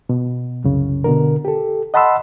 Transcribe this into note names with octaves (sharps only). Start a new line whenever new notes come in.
B2
C2 F#2 C#3
B2 D3 A#4
G4 A4
D#5 F#5 A5 B5 C6 E6